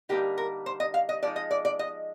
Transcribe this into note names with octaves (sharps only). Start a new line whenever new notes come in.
D3 G3 A#3 D#4 G4
A#4
C5
D#5
F5
D#5
F3 G#3 D#4 D5
D#5
D5
D5
D#5